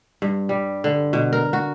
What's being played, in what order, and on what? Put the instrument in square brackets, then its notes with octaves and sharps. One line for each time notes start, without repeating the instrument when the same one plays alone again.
[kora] G2
G3
D3
B2
A#4
F#4